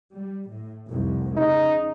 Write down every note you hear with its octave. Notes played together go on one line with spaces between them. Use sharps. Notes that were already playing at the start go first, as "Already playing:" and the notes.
G3
A2
F1 C2
C#3 D#4